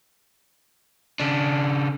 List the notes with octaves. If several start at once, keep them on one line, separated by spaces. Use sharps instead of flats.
C#3 D4